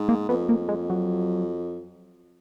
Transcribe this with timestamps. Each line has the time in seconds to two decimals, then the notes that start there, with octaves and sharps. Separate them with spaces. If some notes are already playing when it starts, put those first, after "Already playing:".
Already playing: G#2
0.09 A#3
0.29 F2 B3
0.49 A#3
0.69 G#3
0.90 F#3